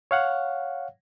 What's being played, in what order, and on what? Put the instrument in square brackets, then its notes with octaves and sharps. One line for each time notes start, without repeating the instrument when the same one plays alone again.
[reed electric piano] C#5 F5 F#5